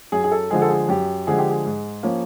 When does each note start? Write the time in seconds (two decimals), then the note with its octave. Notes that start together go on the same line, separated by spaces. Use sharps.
0.12 F#2 G#4
0.24 G#4
0.32 A4
0.50 D3 F3 G#3 G#4
0.62 A4
0.70 G#4
0.89 F#2 G4
1.27 D3 F3 G#3 G#4
1.38 G4
1.50 G#4
1.65 G#2
2.03 F3 A#3 C#4